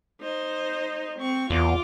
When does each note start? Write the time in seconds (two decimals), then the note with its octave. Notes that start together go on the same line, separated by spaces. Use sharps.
0.21 D#4 C5
1.19 C4 C#6
1.50 E2 F4 D6